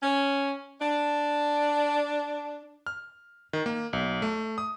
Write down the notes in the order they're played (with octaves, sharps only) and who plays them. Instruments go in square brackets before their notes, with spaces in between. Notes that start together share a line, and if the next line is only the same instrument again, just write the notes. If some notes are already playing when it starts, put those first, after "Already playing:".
[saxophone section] C#4
D4
[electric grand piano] F6
D#3
A#3
B1
A3
D#6